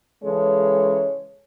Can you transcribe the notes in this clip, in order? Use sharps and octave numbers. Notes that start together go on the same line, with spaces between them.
C#3 E3 G#3 A4 C#5